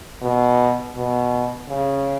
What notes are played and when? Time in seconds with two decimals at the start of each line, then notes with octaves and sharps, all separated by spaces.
0.22 B2
0.96 B2
1.68 C#3